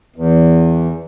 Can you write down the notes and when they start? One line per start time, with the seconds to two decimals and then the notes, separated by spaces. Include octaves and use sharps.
0.16 E2